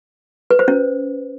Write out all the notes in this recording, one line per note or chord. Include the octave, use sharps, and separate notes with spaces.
B4
C5
C#4